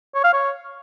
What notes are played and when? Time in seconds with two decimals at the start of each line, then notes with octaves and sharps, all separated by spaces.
0.15 C#5
0.24 F5
0.33 C#5